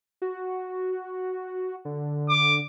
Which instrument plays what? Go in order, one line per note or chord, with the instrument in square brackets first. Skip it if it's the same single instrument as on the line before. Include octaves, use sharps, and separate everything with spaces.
[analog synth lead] F#4
D3
[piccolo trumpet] D6